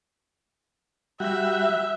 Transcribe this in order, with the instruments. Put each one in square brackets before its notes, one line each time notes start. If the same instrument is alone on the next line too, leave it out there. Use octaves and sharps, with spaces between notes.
[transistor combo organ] G3 F#4 [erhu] E5